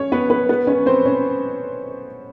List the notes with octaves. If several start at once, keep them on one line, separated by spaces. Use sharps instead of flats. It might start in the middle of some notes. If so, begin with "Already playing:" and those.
Already playing: C#4 C#5
B3 B4
B3 B4
B3 B4
C#4 C#5
C4 C5
C#4 C#5